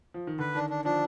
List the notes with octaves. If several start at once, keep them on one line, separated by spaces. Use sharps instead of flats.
F3
D#3
D3 B4
D#3 D4
D4
F3 D4